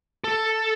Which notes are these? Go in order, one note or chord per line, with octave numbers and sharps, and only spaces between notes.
A4